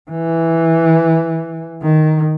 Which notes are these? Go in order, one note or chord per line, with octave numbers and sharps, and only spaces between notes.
E3
D#3